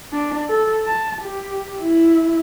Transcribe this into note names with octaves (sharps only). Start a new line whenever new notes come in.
D4
A4
A5
G4
E4